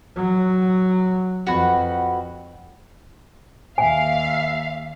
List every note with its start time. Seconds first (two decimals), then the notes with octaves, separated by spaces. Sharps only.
0.16 F#3
1.47 F2 F#4 B4
3.78 D#2 E5 F5 G#5